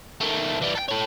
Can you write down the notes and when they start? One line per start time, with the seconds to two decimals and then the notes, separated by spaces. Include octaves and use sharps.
0.21 D#3 A3
0.62 E3 G3
0.75 A4 G5
0.88 A4 C#5